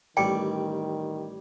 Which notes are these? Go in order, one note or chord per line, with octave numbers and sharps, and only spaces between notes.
A1 D#3 G3 D5 G5